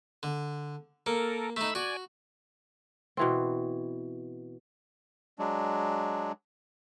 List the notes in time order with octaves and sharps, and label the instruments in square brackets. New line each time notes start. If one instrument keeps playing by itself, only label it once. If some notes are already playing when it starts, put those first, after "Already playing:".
[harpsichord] D3
[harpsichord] A#3 [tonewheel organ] A4 A#4
[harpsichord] A3 D#4 [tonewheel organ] B5 E6
[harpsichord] F#4 [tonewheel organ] D5 G#5
[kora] B2 E3 C4
[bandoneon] F#3 G#3 D4